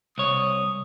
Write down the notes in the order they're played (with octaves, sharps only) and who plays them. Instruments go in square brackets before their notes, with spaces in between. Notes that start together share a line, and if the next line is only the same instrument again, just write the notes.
[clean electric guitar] C2 C#5 [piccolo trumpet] D#6